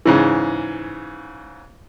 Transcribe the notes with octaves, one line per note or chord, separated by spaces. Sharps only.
G#2 C#3 E3